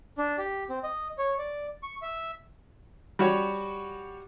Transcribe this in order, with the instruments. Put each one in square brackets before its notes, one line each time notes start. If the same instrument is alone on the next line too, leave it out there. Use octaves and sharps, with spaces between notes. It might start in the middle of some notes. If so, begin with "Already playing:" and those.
[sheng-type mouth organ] D4
G4
C4
D#5
C#5
D5
C#6
E5
[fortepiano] G3 F#4 C#5